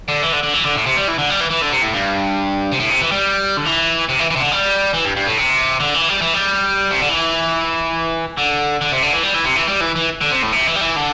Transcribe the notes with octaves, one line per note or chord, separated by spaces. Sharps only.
D3
E3
D3
D3
E3
D3
A2
C3
G3
E3
D3
G3
E3
E3
D3
C3
A2
G2
C3
A2
C3
E3
G3
D3
E3
C3
E3
E3
C3
D3
G3
E3
G2
G2
A2
C3
D3
E3
G3
E3
G3
C3
D3
E3
D3
D3
C3
D3
E3
G3
E3
C3
E3
G3
E3
E3
D3
C3
A2
C3
E3
G3
E3
D3